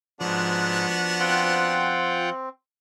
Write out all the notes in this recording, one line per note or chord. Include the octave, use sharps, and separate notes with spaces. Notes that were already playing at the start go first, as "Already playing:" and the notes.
G#2 F3 B3 D4 F#4
C4 F4 F#5 G5